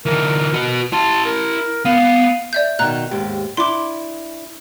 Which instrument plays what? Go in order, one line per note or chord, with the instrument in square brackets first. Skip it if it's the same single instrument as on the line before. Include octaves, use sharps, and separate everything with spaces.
[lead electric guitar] D3 E3 [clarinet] A#4
[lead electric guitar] F#4 B4
[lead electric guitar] E4 C6 [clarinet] A5
[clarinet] A#4
[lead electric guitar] B3 [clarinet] F5
[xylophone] D5 E5 G6
[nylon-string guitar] B2 D#3 [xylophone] A#5 F#6
[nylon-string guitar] D#2 G#2 G4
[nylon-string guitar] D4 E4 [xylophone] C6 D6